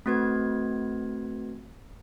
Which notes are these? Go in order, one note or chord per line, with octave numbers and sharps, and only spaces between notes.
A3 C4 F#4 B4 G#6